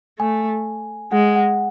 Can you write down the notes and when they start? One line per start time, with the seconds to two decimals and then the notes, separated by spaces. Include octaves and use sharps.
0.19 A3 G#5
1.12 G#3 F#5
1.36 F#5